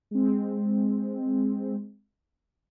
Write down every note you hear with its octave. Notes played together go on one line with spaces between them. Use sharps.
G#3 C4